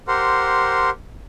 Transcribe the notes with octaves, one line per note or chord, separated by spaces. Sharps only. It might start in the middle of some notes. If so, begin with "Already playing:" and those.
G4 A#4 C5 F#5 C6